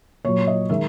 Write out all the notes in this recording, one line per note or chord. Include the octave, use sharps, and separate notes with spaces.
A#2 F#3 C#5
D#5
D#3 G#3 E5